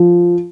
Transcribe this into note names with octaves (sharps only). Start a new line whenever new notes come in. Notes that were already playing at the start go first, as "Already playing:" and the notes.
Already playing: F3